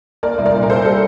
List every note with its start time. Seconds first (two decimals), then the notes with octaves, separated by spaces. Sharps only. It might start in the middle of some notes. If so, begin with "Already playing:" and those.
0.23 A#3 A#4 D5
0.38 C2
0.45 A#4 D5
0.54 A#2
0.63 A#4
0.69 A#3 A4 C5
0.85 G3 A4